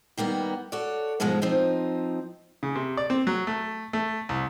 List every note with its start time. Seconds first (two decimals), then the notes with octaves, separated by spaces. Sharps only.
0.17 D#3 G3 A#3 B3
0.72 F#4 A4 C#5 D5
1.20 G#2 B2 F3 F#3 G#3
1.42 F3 C4 D#4
2.63 C#3
2.76 C3
2.97 D5
3.10 C4
3.27 F#3
3.47 A3
3.93 A3
4.29 C2